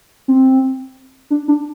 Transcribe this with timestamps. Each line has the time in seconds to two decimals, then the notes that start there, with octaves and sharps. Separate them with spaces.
0.28 C4
1.30 D4
1.48 D4